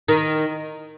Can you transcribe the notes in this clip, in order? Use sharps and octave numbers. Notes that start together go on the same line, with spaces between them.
D#3